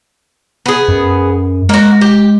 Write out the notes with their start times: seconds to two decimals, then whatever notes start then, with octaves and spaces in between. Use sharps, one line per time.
0.66 B3 G#4
0.88 F#2
1.69 G#3 A#3 F#4
2.01 G4